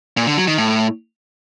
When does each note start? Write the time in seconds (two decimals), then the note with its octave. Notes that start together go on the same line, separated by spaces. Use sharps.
0.17 A#2
0.27 D3
0.37 F#3
0.47 D#3
0.58 A2